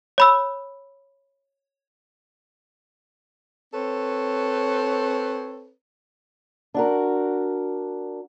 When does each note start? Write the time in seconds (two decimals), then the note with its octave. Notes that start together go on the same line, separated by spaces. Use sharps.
0.18 C#5 B5 E6
3.74 C4 A4 B4 C#5
6.74 D4 F#4 A#4